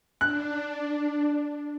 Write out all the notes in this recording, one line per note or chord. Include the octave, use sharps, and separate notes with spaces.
D4 F#6